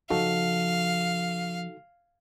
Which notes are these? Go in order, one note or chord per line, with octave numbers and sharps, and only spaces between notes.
C#3 F3 D#4 F#4 A4 F5